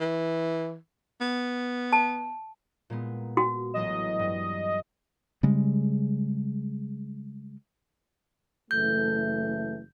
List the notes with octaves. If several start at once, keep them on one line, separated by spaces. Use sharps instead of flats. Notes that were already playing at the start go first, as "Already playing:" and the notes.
E3
B3
A5
A#2 G#3 B3
F#4
A1 F#3 D#5 E7
G2
C#3 G3 G#3
F#1 E3 A3 G6